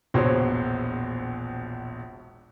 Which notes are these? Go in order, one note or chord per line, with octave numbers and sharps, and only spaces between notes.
E1 A#1 B2 C5 C#5